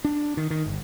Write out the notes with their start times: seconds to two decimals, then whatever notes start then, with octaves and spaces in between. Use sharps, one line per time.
0.04 D4
0.37 D#3
0.50 D#3
0.66 G1